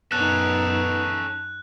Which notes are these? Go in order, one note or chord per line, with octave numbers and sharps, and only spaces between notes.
F#2 B3 C#4 D#4 A4 F#6